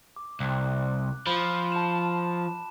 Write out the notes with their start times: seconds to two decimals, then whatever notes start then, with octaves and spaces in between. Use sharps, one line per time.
0.16 D6
0.40 C2 F#6
1.27 F3 B5
1.72 A5 E7